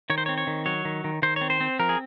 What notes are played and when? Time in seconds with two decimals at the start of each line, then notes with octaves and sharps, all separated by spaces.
0.10 D#3 C#5
0.18 C5
0.26 C#5
0.29 C4
0.38 C#5
0.47 D#3
0.66 F#3 C#5
0.85 D#3
1.04 D#3
1.22 D#3 C5
1.36 C4 C#5
1.50 C5
1.61 C4
1.79 F3 A#4
1.89 G#4